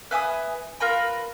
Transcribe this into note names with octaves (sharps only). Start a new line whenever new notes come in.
B4 E5 G#5 D#6
F4 A#4 B4 A#5